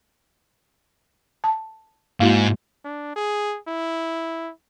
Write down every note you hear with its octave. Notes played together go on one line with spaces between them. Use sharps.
A5
G#2 A#3 E4 F#4
D4
G#4
E4